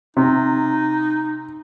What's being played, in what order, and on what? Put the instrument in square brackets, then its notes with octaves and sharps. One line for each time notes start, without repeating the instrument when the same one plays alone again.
[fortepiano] C3 [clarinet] D#4